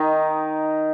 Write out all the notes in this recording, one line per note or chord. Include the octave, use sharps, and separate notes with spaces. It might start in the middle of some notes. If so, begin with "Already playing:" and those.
Already playing: D#3 D#4